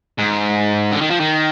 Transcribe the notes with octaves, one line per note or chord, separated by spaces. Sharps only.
G#2
D3
D#3
F3
D#3